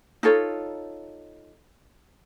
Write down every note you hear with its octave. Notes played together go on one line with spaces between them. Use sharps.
D#4 F4 A4 C#5